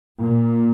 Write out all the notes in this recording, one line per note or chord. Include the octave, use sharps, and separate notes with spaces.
A#2